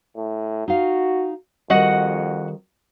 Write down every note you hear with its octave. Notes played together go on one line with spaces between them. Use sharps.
A2
D#4 F4 F#4 F5
F2 D#3 G3 F#4 D#5 F#5